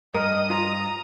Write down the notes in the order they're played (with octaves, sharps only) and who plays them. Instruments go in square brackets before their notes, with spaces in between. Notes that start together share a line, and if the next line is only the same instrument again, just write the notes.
[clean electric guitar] G2 [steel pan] A#4 [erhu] D#5 [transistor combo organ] D#6
[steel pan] F4 [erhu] A#5